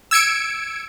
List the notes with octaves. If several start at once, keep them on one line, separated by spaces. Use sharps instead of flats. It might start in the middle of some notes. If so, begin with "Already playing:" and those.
E6 G#6 C#7 D7